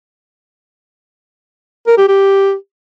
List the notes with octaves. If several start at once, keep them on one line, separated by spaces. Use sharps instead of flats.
A#4
G4
G4